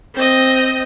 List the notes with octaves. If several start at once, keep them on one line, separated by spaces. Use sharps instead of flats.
C4 D#5